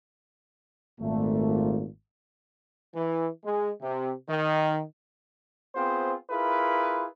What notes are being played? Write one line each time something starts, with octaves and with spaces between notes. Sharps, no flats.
G#1 A#2 A3
E3
G#3
C3
D#3
B3 C4 F4 G#4 C5
E4 F4 G#4 A#4 B4